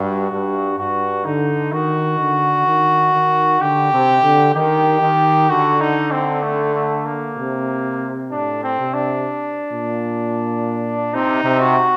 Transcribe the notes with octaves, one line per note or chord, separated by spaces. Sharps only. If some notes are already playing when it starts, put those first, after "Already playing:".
Already playing: G2 F#4
G2
G2 F#4
D3 D#4
D#3 F#4
D3
D#3
D#3
D3 G4
C3
D3
D#3 G4
D#3
D3 F#4
D#4
C4
A3
A3
A#3
C3
A2 D4
C4
C3
D4
A#2
C3 D#4
C3
F#4